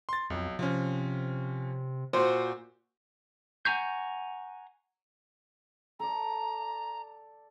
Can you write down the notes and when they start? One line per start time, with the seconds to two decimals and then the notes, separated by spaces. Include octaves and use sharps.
0.09 C6 A6
0.30 B1 F2
0.59 C3 F3 C#4
2.13 A#2 F#4 C5
3.65 F#5 G#5 A#5 C#6 G6
6.00 A4 D5 A#5